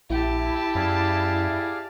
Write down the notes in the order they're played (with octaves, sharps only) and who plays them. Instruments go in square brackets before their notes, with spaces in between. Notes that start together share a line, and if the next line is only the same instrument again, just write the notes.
[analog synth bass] A#1 [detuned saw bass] E4 [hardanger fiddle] G4 A5
[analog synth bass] F#2 [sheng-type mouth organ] G#4 D5 F5